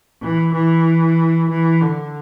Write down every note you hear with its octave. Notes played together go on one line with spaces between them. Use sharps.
E3
E3
E3
D3